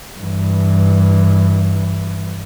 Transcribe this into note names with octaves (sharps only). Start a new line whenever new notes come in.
G2 E3